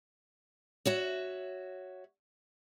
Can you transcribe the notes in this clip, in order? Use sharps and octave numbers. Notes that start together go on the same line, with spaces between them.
F#4 C#5 E5